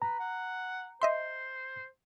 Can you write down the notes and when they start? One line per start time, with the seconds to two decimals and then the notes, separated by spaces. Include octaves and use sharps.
0.02 B4 A#5
0.19 F#5
1.02 C5 D#5 E5 C6